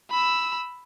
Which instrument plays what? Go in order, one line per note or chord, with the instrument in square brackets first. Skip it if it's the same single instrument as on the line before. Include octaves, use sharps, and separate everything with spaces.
[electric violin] B5 E6